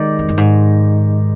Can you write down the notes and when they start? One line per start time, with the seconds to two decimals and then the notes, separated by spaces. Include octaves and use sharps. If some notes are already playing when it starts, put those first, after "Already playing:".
Already playing: D#3 G#3 D#4 G4 D5
0.19 F2
0.29 G2
0.37 G#2